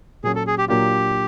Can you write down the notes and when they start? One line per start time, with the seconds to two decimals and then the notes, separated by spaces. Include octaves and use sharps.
0.24 A#2 F#3 A#3 C#4 G#4
0.35 A4
0.47 G#4
0.58 G4
0.68 A#2 F#3 A#3 D4 F4 G4